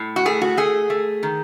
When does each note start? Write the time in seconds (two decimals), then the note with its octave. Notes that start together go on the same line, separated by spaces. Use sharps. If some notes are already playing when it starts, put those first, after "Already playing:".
Already playing: A2
0.16 F#4
0.26 A3 G#4
0.41 F#4
0.57 A3 G#4
0.90 A3
1.23 D#3